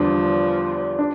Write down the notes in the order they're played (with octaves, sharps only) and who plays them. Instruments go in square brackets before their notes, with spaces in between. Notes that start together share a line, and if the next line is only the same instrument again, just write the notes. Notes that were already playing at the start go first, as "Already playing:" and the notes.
Already playing: [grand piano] E2 D3 G3 D4 [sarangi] F3
[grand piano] D4